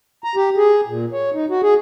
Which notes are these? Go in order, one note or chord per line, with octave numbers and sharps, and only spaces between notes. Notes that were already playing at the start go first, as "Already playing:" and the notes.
A#5
G4
G#4
A#2
C#5
D#4
F#4
G#4